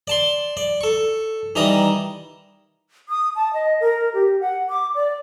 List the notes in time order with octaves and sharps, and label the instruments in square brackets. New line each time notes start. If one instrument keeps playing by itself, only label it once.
[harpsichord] D5 A5 C6
D5
A4 C#6
D#3 E3 G3 A5 A#5 D#6
[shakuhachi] D#6
A5
D#5
A#4
G4
F#5
D6
D5